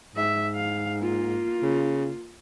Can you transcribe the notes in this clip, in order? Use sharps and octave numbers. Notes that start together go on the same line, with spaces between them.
G#2 E5
F5
A#3 F4
C#3